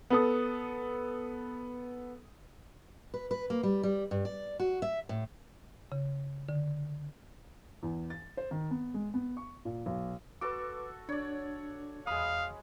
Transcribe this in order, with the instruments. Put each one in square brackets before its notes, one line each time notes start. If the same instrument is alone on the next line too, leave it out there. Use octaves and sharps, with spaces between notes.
[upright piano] B3 A4 D#6
[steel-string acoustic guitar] B4
B4
A#3
G3
G3
G2
D5
F#4
E5
A2
[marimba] C#3
D3
[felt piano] E2
A6
C5
D#3
B3
G#3
B3
C#6
A#2
B1
[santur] F#4 A4 C#6 [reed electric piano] B4 D6
[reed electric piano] D4 [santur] C#5 D5
[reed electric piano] E2 D#6 [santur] G#3 B5 [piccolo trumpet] F5